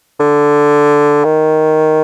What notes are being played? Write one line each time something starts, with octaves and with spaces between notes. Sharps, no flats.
D3
D#3